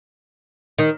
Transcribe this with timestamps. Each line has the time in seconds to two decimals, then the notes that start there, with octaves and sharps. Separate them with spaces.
0.79 D#3